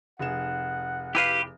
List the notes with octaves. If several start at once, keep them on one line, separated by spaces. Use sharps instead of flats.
F1 G#4 F#5 E7
E4 G4 B4 F5